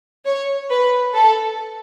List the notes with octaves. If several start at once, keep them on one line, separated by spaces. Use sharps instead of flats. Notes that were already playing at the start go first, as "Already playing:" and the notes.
C#5
B4
A4